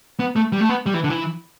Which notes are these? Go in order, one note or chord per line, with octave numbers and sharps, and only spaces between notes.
B3
A3
G3
A3
B3
G3
E3
D3
E3